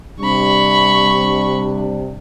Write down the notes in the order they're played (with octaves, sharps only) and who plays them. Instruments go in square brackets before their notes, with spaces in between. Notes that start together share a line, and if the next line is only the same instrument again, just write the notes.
[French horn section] C3 D4 [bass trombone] G3 [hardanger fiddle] B5 C#6